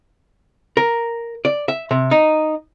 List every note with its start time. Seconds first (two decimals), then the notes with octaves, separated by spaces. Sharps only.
0.77 A#4
1.45 D5
1.68 E5
1.91 C3
2.11 D#4